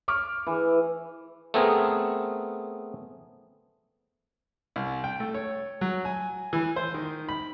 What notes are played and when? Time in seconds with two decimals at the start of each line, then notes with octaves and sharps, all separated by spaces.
0.08 C#6 D6 F6
0.47 E3
1.54 A3 B3 C4 G#4 A#4
4.76 C2
5.04 G5
5.20 A3
5.34 C#5
5.81 F#3
6.05 G#5
6.53 E3
6.76 C5
6.94 D#3
7.29 B5